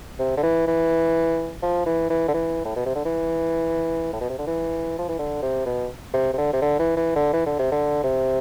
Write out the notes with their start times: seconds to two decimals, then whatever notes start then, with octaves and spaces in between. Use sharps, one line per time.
0.19 C3
0.37 D3
0.43 E3
0.68 E3
1.63 F3
1.86 E3
2.10 E3
2.28 D3
2.34 E3
2.65 A2
2.76 B2
2.86 C3
2.95 D3
3.05 E3
4.13 A2
4.21 B2
4.29 C3
4.39 D3
4.47 E3
4.98 F3
5.09 E3
5.19 D3
5.42 C3
5.66 B2
6.13 C3
6.33 C3
6.38 D3
6.53 C3
6.62 D3
6.79 E3
6.97 E3
7.16 D3
7.33 E3
7.46 D3
7.59 C3
7.72 D3
8.04 C3